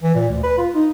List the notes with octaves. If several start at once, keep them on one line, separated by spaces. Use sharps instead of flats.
E3
A#2
D2
B4
F4
D#4